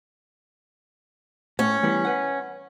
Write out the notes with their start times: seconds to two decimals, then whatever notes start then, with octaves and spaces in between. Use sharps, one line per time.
1.59 A2 C#4
1.83 E3 G3 B3
2.05 B4 F#5